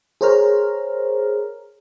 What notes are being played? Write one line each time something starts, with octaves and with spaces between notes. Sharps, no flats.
G#4 A#4 C5 C#5 A#5 F6